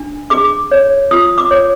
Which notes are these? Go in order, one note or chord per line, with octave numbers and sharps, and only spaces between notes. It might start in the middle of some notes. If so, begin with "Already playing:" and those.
Already playing: D4
G#4 D6
C#5
F4 D#6
D6
C#5